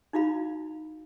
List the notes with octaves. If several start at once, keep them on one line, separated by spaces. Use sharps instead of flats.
D#4 E4 F#4 F5 B5